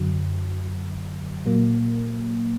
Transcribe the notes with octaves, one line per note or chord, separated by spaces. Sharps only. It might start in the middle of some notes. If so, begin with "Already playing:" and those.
Already playing: F#2 D3 F#3
A#2 F#3 A#3